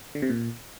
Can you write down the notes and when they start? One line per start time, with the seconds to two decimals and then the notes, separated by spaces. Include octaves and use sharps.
0.15 D3
0.22 C3
0.29 A#2